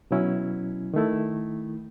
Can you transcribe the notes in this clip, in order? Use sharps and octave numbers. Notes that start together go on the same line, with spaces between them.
B2 F#3 C#4 E4
D#3 A3 E4